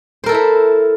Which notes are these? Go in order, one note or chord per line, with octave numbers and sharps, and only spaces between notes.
E4 A4 A#4 C5 E5